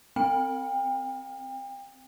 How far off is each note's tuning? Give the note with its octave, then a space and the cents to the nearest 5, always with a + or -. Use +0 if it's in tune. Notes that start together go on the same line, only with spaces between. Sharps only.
C4 +0 G5 +35